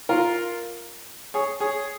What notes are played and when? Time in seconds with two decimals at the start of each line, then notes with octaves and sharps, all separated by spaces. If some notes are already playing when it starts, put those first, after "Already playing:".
0.09 F4 A#4
1.34 G#4 C#5
1.60 G#4 C#5